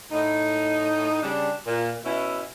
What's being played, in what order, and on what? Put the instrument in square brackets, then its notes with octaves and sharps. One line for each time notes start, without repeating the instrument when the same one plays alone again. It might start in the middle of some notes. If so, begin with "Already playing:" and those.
[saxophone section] A2 D#4
C#3 G3 D4
A#2
B2 C#4 E4